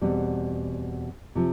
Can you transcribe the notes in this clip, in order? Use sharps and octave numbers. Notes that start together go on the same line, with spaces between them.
E2 B2 G3 C4
C3 F3